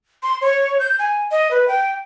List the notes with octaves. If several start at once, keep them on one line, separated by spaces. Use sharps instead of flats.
C6
C#5
G6
G#5
D#5
B4
G5